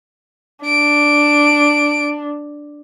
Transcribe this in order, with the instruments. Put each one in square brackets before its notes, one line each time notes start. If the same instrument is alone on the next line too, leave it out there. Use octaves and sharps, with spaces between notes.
[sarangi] D4 [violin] D7